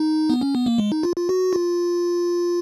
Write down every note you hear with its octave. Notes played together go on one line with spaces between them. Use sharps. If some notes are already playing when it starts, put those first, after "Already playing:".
Already playing: D#4
B3
C#4
B3
A#3
G#3
D#4
F4
F4
F#4
F4